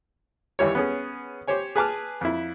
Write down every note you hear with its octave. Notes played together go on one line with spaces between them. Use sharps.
D#2 E3 G3 C#5
B3 C#4 G#4
G4 C5 C#5 G#5
G#4 B4 G#5 A5 D6 F6
F2 E4